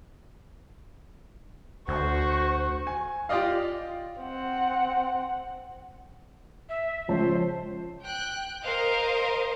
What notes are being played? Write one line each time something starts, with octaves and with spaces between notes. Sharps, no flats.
D2 F#4 C5 C#6
G#5
F4 G4 D5 D#5 F5
C4 F#5
E5
C#2 F3 C5 C#5 A5
G5 F#6
A#4 C5 D#5 F5